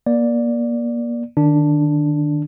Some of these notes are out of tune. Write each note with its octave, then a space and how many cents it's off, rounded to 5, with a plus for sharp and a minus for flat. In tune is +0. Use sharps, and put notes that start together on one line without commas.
A#3 +30 D5 +0
D#3 -35 D4 +0